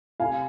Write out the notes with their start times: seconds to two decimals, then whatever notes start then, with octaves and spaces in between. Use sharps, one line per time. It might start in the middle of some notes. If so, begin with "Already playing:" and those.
0.20 C3 F5 G#5